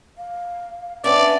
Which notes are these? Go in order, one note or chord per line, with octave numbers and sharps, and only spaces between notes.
F5
B3 C#4 D4 D5 E5